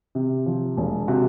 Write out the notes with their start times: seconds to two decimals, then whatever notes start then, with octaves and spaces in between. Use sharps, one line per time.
0.15 C3
0.46 F3
0.77 E1
1.08 C3 F#4